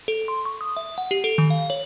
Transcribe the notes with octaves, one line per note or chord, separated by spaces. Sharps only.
A4
C6
C#6
D#6
E5
F#5
G4
A4
D#3
F5
C#5